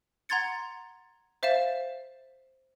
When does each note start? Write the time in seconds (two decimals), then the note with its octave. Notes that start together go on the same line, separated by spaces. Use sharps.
0.29 F#5 A#5 C6 G#6 A6 C#7
1.43 C5 E5 F5 A6 E7